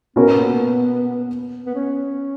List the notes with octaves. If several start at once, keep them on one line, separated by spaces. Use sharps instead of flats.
B2 A#3 B3 C#4 F#4 A#4
B3
C#4